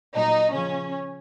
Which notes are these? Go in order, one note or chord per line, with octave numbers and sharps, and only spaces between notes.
A#2 F#3 D#4
C#3 F3 C#4